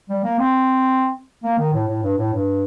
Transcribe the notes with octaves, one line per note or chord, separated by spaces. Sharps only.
G3
A#3
C4
A#3
D#3
A2
A2
G2
A2
G2